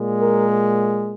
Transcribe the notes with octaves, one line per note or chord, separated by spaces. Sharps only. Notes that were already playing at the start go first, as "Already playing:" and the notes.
Already playing: A#2 G#3
A#4